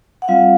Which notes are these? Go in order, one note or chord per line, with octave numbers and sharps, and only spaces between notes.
F#5
G3 C4 F4 F5